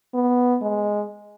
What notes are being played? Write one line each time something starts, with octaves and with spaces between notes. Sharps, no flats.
B3
G#3